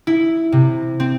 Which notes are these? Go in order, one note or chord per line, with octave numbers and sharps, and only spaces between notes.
E4
C3
C4